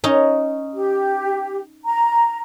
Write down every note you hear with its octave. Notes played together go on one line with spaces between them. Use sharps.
C#4 D#4
G4
A#5